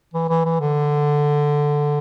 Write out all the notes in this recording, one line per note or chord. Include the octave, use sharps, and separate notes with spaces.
E3
E3
E3
D3